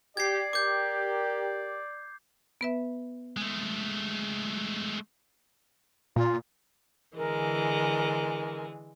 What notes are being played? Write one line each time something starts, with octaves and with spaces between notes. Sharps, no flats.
G4 D5 G#6 C7
G4 A#4 D6 G6
B3 B4 E5
G#3 A3
A#2 F4
D3 E3 G#3 A#4